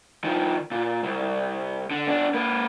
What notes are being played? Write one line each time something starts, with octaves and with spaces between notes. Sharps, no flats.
D#3 F3
A#2
C2
D3
B3 D4
A#3 B4